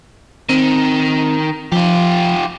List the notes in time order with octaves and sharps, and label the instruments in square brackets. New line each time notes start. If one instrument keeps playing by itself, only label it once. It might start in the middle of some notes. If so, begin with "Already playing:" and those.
[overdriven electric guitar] D#3 [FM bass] C4
[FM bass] F3 [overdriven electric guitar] F4 G4